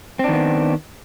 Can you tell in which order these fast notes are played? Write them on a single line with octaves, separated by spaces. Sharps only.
C4 D4 D#3 B3